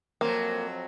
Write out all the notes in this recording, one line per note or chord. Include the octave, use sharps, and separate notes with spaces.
F2 F#3 A#3 C4